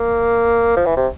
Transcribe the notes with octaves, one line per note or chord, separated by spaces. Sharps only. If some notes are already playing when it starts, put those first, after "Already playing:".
Already playing: A#3
F3
E3
C3